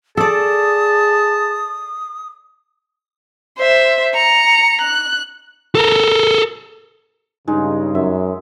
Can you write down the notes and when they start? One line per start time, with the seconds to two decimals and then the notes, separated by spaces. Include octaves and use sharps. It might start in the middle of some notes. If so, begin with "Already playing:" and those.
0.17 G#4 A4 D5 A5 D#6
3.58 C5 E5
4.14 A#5 C#7
4.81 F#6
5.75 A4 A#4
7.48 G2 C#3 G#3 D#4
7.95 F#2 E5